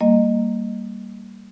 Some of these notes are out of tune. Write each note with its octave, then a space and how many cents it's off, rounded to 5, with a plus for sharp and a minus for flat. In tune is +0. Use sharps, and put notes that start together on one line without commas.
G3 +0 A#3 -10 D#5 -15